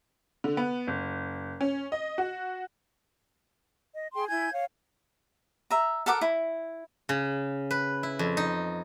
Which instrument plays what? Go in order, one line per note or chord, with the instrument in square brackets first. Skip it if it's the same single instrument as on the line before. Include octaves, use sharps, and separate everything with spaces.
[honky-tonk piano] D3
B3
F#1
C#4
D#5
F#4
[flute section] D#5
G#4 G5 C6
E4 G#5 G6 G#6
C#5 F5
[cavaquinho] E5 A#5
A4 A#4 F#5 D6
E4
[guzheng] C#3
B4
E4
F2
D#4